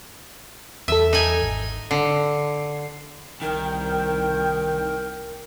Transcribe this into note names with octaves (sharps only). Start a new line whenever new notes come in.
E2 A4 E5
D#4 G#5
G#1
D3 C7
C2 D#3 A#4 G5